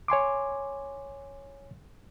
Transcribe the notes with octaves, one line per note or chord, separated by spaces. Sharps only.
C#5 G#5 C6 D6